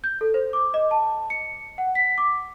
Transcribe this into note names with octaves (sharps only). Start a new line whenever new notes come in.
G6
A4
C5
D6
D#5
A5
C#7
F#5
B6
D6